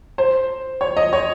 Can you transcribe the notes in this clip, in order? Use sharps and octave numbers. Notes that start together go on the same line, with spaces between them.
C5
C#5
D#5
C#5